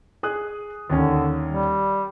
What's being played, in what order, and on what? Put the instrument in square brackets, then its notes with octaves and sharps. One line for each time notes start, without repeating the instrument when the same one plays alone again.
[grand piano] G#4 D#6 F#6
[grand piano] D#2 C#4 [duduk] D3
[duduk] G3